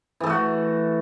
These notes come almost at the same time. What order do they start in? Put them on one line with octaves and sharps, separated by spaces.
E3 A4 A3 F#4